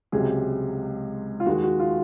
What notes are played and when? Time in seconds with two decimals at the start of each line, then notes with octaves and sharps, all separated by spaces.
0.12 C#2 C3 F#3 G#4
1.40 F4
1.46 D#2 D#3 G#3 F#4
1.63 F#4
1.80 F4